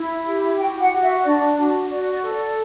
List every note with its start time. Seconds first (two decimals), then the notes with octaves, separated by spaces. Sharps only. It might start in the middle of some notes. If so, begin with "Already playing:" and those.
Already playing: E4
0.26 G4
0.58 F#4 G5
0.80 F#5
0.91 F#4
1.02 E5
1.24 D4 D5
1.57 F#4
1.89 F#4 D5
2.12 D5
2.22 A4
2.33 D5